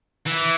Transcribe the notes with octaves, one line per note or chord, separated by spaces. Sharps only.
E3